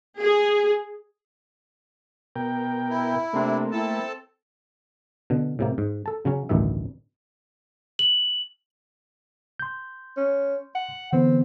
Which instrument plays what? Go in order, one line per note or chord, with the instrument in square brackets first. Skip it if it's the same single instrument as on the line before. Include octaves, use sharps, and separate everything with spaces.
[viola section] G#4
[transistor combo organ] B2 A#4 G5
[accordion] E4
[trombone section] C3 C4 D4 [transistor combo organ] A3 A#3
[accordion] C4 A4 A5 [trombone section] E4
[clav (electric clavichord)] B2 D3
A2 C3 A#3
G#2
A4 A5
C#3 F#3 C#4
A1 D2 G2 D#3 E5
[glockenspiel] F#7
[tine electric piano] C6 G6
[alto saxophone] C#4
F#5
[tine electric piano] D3 E3 B3 [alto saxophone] C4